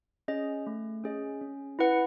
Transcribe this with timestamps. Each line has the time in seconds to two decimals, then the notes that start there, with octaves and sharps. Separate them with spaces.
0.28 C#4 G#4 D#5
0.67 A3
1.04 C#4 G#4 D#5
1.41 C#4
1.79 E4 B4 F#5